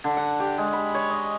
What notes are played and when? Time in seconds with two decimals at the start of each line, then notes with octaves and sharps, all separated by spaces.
0.04 D3
0.17 F#5
0.40 G4
0.58 G#3
0.73 B5
0.94 C#5
1.10 D#5